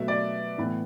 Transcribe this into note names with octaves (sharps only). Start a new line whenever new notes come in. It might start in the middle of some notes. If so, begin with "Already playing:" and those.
Already playing: B2 F#3 A3 E5
D5
A2 E3 B3